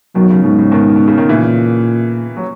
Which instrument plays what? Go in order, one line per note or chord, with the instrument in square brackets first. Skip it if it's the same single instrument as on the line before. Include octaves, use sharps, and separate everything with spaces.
[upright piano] B2 D#3 [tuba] F#3
[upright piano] C#3
[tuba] G#2 [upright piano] B2
[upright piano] C#3
B2 D#3
B2
C#3
D#3
[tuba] A#2 [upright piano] C#3 E3
[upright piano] F#3